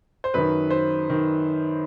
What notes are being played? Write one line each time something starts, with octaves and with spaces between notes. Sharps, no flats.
C5
F#2 D#3 B4
C5
D#3